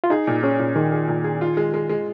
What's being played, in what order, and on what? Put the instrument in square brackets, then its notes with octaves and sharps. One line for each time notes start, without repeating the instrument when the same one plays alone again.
[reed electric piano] F4
[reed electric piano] D#4 [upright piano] G#4
[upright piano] A#2
[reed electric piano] C#4 [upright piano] G#4
[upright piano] A#2
[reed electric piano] D#3 [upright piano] G#4
[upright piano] G#4
A#2
G#4
F4
G#3
G#3
G#3